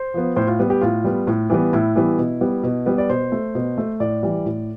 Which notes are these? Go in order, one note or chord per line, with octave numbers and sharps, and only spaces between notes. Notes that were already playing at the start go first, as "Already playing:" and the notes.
Already playing: C5
F3 B3
A2 C5
F4
G3 B3
G4
A2 F4
G3 B3
A2
E3 G3 B3
A2 E4
E3 G3 B3
B2
G3 B3
B2
G3 B3
D5
B2 C5
A3
B2
A3
A2 D5
E3 G3
A2